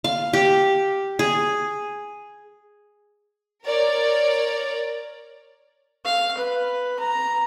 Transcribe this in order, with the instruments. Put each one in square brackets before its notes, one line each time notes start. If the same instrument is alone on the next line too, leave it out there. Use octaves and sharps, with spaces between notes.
[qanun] F5
G4
G#4
[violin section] A#4 C#5 D5
[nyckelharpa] F5
B4
A#5